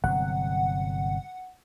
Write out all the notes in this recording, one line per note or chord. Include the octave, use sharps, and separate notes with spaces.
G1 C3 F#3 F#5